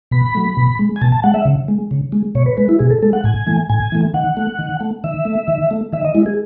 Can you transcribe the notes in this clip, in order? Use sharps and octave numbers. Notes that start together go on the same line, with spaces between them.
B2 B5
F#3 A3
B2
G#3
G#5
B2 A5
A5
G#3 F#5
E5
C#3
G#3
C#3
G#3
B2 C#5
B4
G#3 B4
E4
B2 G#4
A4
G#3 A4
F#5
A2 G#5
E3 A3
A2 G#5
E3 A3
D#3 F#5
A3
D#3
A3
D#3 E5
A3
D#3
A3
D#3 E5
D#5
G#3 E4
G#4